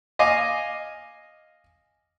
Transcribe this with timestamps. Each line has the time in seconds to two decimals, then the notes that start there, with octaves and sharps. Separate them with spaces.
0.19 D#5 F5 G#5 D6